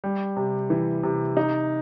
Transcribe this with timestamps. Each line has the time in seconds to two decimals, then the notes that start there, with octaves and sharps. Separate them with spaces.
0.04 G3
0.37 C3
0.70 E3
1.03 C3
1.37 D#4